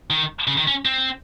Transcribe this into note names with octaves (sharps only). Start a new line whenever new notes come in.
D#3
C#3
D#3
C#4
C4